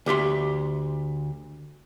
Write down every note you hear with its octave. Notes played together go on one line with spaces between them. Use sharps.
D2 G4 E5 C6